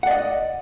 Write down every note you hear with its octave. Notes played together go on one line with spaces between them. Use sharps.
D5 D#5 F#5